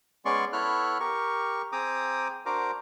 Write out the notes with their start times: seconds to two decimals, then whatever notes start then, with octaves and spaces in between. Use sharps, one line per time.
0.25 G#3 B3 C#4 D5 C6 C#6
0.53 B3 E4 A4 C#5 F6 F#6
1.00 G4 A#4 C#6
1.72 C4 G#4 G5 A#5 D6 D#6
2.46 D4 F#4 A#4 C5 A#5 D6